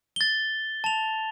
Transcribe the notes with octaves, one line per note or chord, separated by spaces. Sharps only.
A6 G7
A5 F7